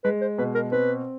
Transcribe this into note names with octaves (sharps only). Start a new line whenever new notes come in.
G#3 B4
C5
B2 B4
A#4
C4 B4